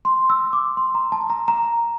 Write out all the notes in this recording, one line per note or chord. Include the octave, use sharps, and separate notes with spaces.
C6
E6
D6
C6
A#5
A5
A#5
A#5